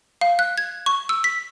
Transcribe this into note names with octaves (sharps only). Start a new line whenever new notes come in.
F5
F#6
G#6
C#6
E6
B6